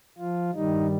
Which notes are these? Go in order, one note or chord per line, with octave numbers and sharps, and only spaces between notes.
F3 F4
G2 D#3 G3 D#4